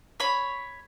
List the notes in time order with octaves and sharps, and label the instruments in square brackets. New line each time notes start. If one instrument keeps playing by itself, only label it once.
[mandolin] C#5 B5